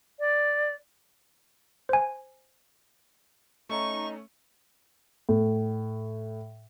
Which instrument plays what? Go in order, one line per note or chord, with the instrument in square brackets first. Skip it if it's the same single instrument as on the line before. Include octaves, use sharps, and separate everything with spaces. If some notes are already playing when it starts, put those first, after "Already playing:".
[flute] D5
[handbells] C5 G#5
[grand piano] A3 C#4 [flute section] D#4 [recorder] C#6
[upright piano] A2